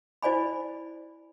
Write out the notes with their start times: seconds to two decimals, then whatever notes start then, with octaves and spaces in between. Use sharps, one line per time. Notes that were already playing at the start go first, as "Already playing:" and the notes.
0.22 E4 C5 D5 G#5 B5